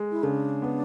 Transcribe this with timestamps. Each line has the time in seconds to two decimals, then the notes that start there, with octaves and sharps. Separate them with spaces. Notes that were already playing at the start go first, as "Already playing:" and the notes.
Already playing: G#3
0.11 E4
0.23 C#3 D4
0.62 B3